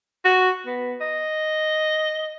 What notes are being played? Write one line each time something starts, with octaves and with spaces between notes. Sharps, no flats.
F#4
B3
D#5